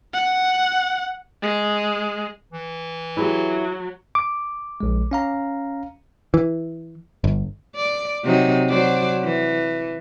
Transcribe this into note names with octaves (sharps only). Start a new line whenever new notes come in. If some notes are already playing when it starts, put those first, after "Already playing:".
F#5
G#3
E3
F#3 E4 G4 G#4
D6
A#1 G#3
C#4 F5 A#5
E3
G1
D5
C3 F#3 D#4
F#3 C5 D5
E3